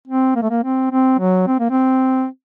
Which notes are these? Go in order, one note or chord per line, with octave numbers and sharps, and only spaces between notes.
C4
A#3
A3
A#3
C4
C4
F#3
C4
A#3
C4